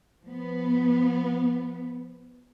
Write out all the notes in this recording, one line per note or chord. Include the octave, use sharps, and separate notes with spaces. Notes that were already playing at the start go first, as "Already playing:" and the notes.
F3 B3